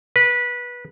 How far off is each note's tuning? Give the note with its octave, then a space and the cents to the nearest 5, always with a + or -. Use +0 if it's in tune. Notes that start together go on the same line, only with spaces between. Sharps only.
B4 -20